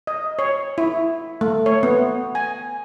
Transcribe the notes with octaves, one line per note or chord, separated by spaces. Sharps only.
D#5
C#5
E4
A3
C#5
B3
G#5